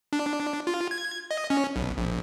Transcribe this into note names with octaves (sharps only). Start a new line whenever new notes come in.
D4
F4
G#6
D#5
C#4
B1
A#1